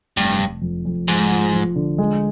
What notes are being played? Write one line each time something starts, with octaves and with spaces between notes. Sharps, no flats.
F1 G2
F1
F2
F2
G#2 F3
F3
F3
D3
G#3